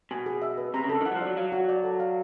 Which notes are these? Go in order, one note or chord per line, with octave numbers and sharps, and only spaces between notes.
B2 G#5
G#4
E5
B4
C3 A#5
C#3
A4
D3
D#3
E3 F#5
F#3
F3
D5
F#3
F#3 F5
F#4
D5
A4
F5